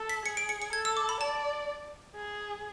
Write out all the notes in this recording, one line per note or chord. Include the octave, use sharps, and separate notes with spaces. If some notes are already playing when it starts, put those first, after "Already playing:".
Already playing: A4
B6
G#4 C#7
D7
C#7
C#7
A4 G#6
E6
D6
B5
D5 A5
G#4